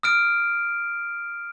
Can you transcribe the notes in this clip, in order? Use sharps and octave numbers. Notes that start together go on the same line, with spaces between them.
D#6 F6 D7